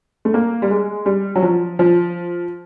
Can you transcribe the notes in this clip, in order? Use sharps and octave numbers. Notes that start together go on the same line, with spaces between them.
A3
A#3
G3
G#3
G3
F#3
F3
F3